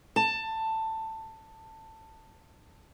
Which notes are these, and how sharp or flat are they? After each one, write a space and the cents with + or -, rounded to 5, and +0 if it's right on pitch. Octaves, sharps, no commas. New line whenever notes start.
A5 +15